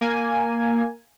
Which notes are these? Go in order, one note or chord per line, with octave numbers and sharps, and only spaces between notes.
A#3 G#5